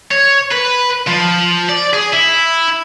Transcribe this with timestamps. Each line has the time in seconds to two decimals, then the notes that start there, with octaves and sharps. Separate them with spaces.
0.11 C#5
0.52 B4
1.07 F3
1.69 D5
1.94 G#4
2.13 E4